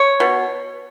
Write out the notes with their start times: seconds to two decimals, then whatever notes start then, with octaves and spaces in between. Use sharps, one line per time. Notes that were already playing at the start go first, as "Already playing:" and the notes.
Already playing: C#5
0.20 B2